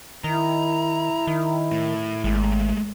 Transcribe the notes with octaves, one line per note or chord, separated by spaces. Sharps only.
D#3 E4 A#5
D#3
A2
G#1 G#3 A3